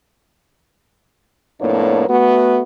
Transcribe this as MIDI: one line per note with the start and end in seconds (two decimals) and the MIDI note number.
1.60 2.05 41
1.60 2.05 45
1.60 2.05 58
1.60 2.05 59
1.60 2.05 62
1.60 2.05 73
2.08 2.62 57
2.08 2.62 59
2.08 2.62 66